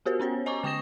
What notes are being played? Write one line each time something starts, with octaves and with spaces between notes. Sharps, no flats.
B3 F#4 G4 A#4 C5
B3 C#4 C5 C#5
D#5 G#5 A#5 C#6 D6
D3 G5 C#6 D#6 A#6 E7